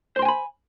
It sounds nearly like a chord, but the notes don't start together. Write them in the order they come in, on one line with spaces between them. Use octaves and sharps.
C5 C6 G5 G#5 B5